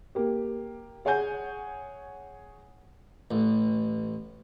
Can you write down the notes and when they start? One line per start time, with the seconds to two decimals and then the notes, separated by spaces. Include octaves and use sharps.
0.15 A#3 G4
1.05 G#4 C#5 F#5 G#5 G6
3.31 A1